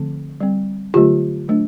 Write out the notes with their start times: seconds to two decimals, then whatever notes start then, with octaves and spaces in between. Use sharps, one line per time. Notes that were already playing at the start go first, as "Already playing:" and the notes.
Already playing: D3 F3 A3 C4
0.41 G3 C4
0.94 D3 F#3 A3 F4 G4
1.48 F#3 A3 D4